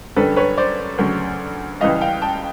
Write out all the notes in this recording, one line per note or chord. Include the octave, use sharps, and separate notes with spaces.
F#2 D3 G3 A4 B4
B4 C#5
C5 D5
D2 C#3 F#3
C#2 C#3 E3 G3 D#5 F5
F5 G5
G5 A5